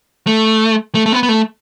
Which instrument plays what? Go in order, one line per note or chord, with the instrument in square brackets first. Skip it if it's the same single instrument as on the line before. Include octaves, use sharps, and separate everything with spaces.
[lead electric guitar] A3
A3
A3
B3
B3
A3